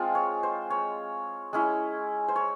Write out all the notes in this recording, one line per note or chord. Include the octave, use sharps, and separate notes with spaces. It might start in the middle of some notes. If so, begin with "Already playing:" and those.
Already playing: G#3 C4 F4
C#5
C5
C#5
G#3 C#4 E4
C5
C#5